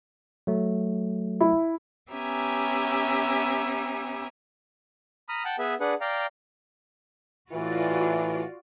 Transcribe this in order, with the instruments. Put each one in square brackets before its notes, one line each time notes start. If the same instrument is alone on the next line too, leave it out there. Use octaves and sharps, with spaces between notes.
[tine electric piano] F#3 A3
[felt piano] E4
[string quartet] B3 C#4 G4 E5 G#5 A#5
[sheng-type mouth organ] A#5 B5 D#6 F6
F#5 G5 A5 F#6
B3 G#4 B4 E5
D4 G#4 B4 F#5
D5 F5 G5 A#5
[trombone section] A2 E3 [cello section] F4 F#4 D5